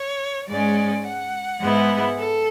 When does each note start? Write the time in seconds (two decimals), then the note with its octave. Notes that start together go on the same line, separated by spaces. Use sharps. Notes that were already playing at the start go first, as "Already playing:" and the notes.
Already playing: C#5
0.50 G#2 G#3 C#4 D5
1.06 F#5
1.62 G#2 G#3 B3 E4
2.18 A4